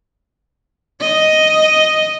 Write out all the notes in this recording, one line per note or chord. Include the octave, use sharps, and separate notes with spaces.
D#5